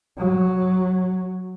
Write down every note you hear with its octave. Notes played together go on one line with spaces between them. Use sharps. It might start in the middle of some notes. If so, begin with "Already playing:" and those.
F#3